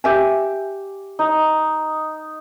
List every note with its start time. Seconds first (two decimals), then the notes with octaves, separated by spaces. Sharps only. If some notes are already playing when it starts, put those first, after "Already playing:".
0.04 G4 E5 G#5
1.19 D#4